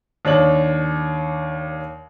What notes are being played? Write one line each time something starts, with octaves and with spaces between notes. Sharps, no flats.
D#2 D4 C#5 F#7